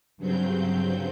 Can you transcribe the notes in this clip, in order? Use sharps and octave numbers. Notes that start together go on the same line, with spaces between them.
G2 C#3 F#3 C4 G6